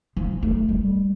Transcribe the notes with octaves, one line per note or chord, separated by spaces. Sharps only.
F3
A3
G3